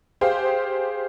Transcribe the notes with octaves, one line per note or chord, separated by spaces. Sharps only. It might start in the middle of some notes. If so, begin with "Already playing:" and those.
G4 G#4 C5 F5 G5